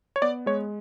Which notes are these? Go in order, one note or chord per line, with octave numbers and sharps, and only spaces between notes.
C#5
B3 D5
G#3 C#5